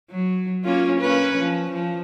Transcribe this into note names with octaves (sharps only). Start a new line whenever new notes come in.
F#3
A#3 C#4 F4
A#3 C#4 B4
F3
F3